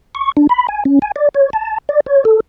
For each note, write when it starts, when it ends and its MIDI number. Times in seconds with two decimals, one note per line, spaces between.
0.15 0.32 85
0.37 0.47 62
0.49 0.67 83
0.68 0.84 80
0.85 0.99 61
1.02 1.12 80
1.16 1.29 74
1.35 1.50 73
1.53 1.78 81
1.89 2.00 74
2.06 2.24 73
2.25 2.40 69